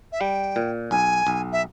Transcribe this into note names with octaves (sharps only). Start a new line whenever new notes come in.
E5
G3 G5
A#2
B1 G#5
B1
E5